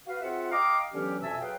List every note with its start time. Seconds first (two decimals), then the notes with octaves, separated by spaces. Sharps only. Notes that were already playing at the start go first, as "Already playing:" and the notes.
0.07 F#4 B4 F5
0.21 C4 F4 G#4 E5 F#5
0.52 D#5 F5 G5 A#5 D6 D#6
0.93 D3 E3 F#3 B3 C#4 G4
1.22 F2 B2 E5 G#5 A5 E6
1.41 F#3 G#4 B4 F5 G5